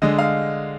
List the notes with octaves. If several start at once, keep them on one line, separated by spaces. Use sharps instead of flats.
D3 G#3 D#5
F5